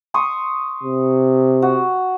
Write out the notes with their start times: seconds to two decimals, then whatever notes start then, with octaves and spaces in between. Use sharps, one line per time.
0.14 C6 C#6 D#6
0.83 C3
1.62 F#4